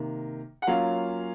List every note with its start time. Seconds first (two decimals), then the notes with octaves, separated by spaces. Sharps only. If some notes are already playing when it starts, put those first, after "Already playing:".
Already playing: C3 D#3 A#3
0.62 F#5
0.67 F#3 A#3 C#4 F4 F5